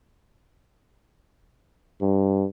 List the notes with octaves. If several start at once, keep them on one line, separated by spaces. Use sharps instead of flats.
G2